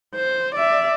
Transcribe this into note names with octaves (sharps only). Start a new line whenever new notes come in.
C5
D5 E5